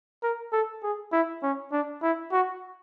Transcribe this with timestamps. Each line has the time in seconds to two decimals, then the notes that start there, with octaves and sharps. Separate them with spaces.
0.23 A#4
0.52 A4
0.83 G#4
1.12 E4
1.43 C#4
1.72 D4
2.03 E4
2.32 F#4